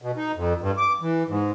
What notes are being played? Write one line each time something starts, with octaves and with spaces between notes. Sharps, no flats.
B2
D#4
F2
G2
D6
E3
G#2